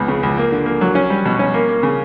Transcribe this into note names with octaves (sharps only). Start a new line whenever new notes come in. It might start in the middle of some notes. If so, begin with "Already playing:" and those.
Already playing: C#2 B3
C#3
C#2
A#3
D3
A#3
F#3
C#4
G3
B2
C#4
A#3
A#3
C#3